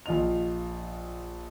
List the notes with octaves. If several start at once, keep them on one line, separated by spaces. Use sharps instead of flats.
A#1 F4 D#5 F7